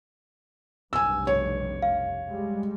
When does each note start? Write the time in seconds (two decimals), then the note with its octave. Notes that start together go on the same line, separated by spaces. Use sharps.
0.93 F1 B1 G2 G#5 E6
1.27 C#5
1.82 F5
2.27 G3 G#3